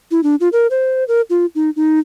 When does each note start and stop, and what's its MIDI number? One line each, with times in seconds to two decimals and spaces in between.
0.11 0.23 64
0.23 0.35 62
0.40 0.49 65
0.53 0.67 70
0.71 1.04 72
1.08 1.21 70
1.30 1.46 65
1.55 1.70 63
1.76 1.99 63